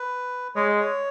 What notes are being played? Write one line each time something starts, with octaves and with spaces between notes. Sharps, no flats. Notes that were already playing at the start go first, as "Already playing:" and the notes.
Already playing: B4
G#3 C#5
D#5
C#5